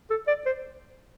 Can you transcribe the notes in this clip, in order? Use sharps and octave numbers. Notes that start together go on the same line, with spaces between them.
A4
D5
C5